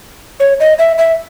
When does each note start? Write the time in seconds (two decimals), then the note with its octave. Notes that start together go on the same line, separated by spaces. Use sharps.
0.40 C#5
0.60 D#5
0.79 E5
0.98 E5